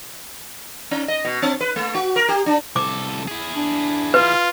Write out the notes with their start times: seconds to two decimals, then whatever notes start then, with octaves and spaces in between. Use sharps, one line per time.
0.91 C#4
1.08 D#5
1.25 B2
1.42 C4
1.61 B4
1.76 A3
1.95 F#4
2.16 A#4
2.29 G4
2.46 D4
2.76 C2 A4 D6
3.28 E4 G#4
3.56 D4
4.14 F4 B4